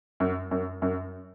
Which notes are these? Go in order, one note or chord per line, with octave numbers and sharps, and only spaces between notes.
F#2
F#2
F#2